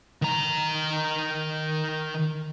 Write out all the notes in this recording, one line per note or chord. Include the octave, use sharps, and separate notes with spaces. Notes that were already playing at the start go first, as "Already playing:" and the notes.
D#3 A#5